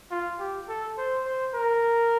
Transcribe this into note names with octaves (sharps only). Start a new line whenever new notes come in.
F4
G4
A4
C5
C5
A#4